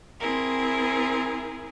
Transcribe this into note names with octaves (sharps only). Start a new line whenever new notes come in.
C4 E4 G#4 A#4